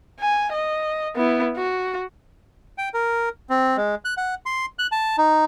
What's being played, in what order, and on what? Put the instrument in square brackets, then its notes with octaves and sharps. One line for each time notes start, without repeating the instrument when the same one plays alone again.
[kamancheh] G#5
D#5
B3 E4
F#4
[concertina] G5
A#4
C4
G#3
F#6
F#5
C6
F#6
A5
D#4